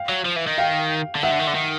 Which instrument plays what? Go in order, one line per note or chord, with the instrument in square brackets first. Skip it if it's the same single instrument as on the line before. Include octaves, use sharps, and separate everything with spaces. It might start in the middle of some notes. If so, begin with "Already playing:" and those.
Already playing: [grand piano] F5 G5
[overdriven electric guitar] F#3
F3
E3
D#3
[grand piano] F5 G5
[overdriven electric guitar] D3
[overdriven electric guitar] D#3 [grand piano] E5 F#5
[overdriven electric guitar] D3
D#3
D3
D#3